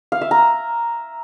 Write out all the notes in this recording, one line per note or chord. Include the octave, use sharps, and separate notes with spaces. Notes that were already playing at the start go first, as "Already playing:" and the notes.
F5
E5
A#5